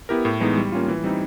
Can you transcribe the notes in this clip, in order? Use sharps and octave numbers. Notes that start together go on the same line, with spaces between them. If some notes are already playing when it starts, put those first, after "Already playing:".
B3 E4 G4 A#4
A2
E3 G#3 B3 D#4
G3
A#3 C#4 F4
E3
G3 C4 D#4